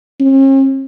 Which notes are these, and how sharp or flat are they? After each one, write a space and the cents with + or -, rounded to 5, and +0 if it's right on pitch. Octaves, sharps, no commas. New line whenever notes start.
C#4 -45